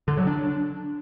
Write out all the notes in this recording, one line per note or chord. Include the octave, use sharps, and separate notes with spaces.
D3
F#3
D4